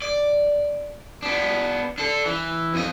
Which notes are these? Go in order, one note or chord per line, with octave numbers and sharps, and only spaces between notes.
D5
B3 D4
D4 A4
E3
F2 D#5